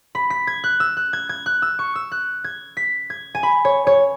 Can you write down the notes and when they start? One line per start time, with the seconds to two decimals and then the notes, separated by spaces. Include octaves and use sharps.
0.15 B5
0.30 B6
0.47 G#6
0.64 F#6
0.80 E6
0.97 F#6
1.13 G#6
1.29 G#6
1.46 F#6
1.62 E6
1.79 C#6
1.95 E6
2.12 F#6
2.44 G#6
2.77 B6
3.10 G#6
3.35 G#5
3.43 B5
3.65 C#5
3.87 C#5